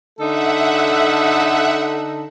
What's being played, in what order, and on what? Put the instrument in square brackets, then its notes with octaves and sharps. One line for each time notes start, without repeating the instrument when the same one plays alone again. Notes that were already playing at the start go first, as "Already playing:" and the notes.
[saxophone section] D3 D#4 A4 [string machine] E5 F#5